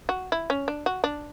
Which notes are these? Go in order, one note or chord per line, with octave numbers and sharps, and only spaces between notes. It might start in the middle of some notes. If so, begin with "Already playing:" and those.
F#4
E4
C#4
D4
F#4
D4